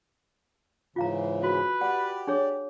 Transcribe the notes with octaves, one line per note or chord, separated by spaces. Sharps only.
G#2 C#3 E3 F4 F5 A#5
F#4 B4
G4 D5 F#5
D4 G#4 C#5